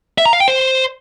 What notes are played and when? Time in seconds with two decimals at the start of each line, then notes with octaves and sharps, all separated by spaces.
0.18 E5
0.26 A#5
0.33 F5
0.40 G5
0.48 C5